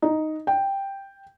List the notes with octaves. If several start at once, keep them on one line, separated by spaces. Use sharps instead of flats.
D#4
G5